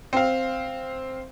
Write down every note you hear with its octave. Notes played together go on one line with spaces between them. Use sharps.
C4 F5